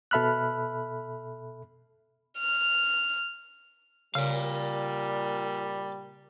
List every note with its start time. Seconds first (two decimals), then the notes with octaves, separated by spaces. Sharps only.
0.11 B2 A4 E5 B5 F6 F#6
2.39 F6
4.15 A#2 C#3 G3 D5 F5